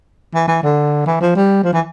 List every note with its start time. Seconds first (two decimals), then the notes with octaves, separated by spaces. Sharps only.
0.34 E3
0.48 E3
0.63 D3
1.06 E3
1.21 F3
1.35 G3
1.63 F3
1.73 E3